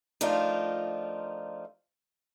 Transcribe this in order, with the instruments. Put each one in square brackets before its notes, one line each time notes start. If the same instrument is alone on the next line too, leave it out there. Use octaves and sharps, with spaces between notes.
[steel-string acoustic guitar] F3 A3 D4 D#4 F4 A#4